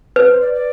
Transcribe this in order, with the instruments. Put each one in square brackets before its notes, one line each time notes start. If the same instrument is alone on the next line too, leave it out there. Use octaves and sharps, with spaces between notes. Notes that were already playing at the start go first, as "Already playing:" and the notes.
[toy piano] B4
[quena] C5
D5
D5